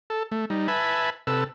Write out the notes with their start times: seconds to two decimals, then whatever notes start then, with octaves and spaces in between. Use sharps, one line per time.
0.10 A4
0.32 A3
0.50 G3 D#4
0.68 B4 E5 G#5 A5 B5
1.27 C3 A4 B4 E6